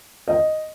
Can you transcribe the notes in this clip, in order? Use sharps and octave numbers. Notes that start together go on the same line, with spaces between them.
D#5